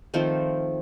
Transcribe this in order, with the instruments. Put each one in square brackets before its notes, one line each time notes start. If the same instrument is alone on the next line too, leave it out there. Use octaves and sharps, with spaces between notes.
[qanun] D#3 F3 A3 C4